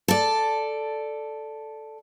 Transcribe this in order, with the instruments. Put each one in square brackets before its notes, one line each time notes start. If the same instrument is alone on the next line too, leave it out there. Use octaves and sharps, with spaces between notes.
[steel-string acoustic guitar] A4 D5